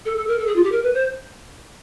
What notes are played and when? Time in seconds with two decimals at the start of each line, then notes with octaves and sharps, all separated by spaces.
0.05 A4
0.17 A4
0.28 A#4
0.39 A4
0.47 G#4
0.56 F4
0.64 G4
0.72 A#4
0.83 B4
0.94 C5